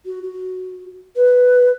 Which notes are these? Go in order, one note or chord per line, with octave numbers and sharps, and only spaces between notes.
F#4
F#4
B4